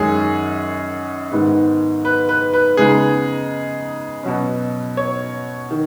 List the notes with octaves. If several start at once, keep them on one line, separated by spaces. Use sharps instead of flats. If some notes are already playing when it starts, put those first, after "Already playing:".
Already playing: F#2 D#3 G#3 C#4 G#4
G#2 D#3 B3
B4
B4
B4
C#3 G#3 B3 D#4 G#4
B2 F#3 C#4
C#5
D#3